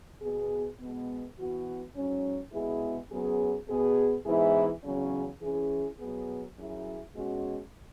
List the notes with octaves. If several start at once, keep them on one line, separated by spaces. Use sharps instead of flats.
B2 B3 G#4
B2 G#3 B3
E3 B3 F#4
G#2 F#3 C#4
B2 G#3 B3 E4 G#4
F#2 F#3 B3 G#4
B2 B3 G#4
G#2 E3 B3 E4 G#4
E2 C#3 F#3 C#4
E3 C#4 E4 G#4
B2 F#3 B3 G#4
F#2 F#3 E4 G#4
B2 G#3 C#4 F#4